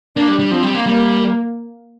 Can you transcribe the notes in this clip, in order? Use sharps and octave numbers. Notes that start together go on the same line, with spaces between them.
A#3 D4
G3
G3
F3 C4
G3
A#3
G3 A#3